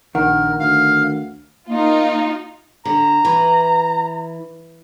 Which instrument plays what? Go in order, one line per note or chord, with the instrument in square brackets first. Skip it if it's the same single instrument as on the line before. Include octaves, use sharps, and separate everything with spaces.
[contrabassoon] A#1 [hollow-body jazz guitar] D#3 [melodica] A#4 [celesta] F#5
[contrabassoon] D2 [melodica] F5
[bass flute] A#3 [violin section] D#4 F4
[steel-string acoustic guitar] D3 [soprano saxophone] A#5
[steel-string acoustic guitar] E3